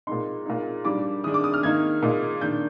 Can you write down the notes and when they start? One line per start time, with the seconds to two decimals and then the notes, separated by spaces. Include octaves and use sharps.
0.07 A#2 G#3 D#4 C6
0.46 A#2 G#3 D#4
0.85 G#2 G3 D4 D6
1.24 G#2 D#3 G#3 D4 D#6
1.34 D6
1.44 D#6
1.54 F6
1.63 G#2 D#3 A#3 D#4 G#6
2.03 A#2 G#3 D#4
2.41 D#3 A#3 D4 G6